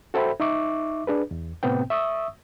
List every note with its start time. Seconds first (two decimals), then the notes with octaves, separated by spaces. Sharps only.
0.14 F#4 A4 C5 E5 G5 B5
0.40 D#4 E5 C#6 D6
1.07 D4 G#4 B4
1.31 E2
1.63 A2 C3 B3 C4 G5
1.90 E5 C#6 D#6 E6